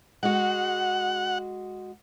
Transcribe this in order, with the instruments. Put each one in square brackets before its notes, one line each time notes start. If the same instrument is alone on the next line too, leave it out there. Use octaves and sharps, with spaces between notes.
[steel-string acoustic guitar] G#3 F#4 [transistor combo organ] F#5